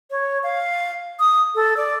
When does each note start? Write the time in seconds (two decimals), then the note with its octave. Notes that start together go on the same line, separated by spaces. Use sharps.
0.11 C#5
0.43 F5
1.20 D#6
1.55 A4
1.77 D5